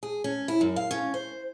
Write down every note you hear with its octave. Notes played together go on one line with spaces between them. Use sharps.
G#4
C#4
E4
F#2
F5
C#4
C5